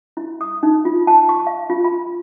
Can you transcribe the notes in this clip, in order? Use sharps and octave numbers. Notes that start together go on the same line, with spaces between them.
E4
D#6
D#4
F4
A5
C#6
F5
F4
B5